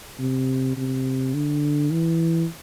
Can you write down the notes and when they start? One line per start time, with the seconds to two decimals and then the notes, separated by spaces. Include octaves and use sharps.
0.19 C3
0.77 C3
1.34 D3
1.92 E3